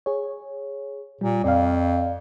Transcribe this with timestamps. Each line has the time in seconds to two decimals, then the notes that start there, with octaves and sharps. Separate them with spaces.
0.06 G#4 C#5
1.21 A#2 G3
1.44 F2 D5 F5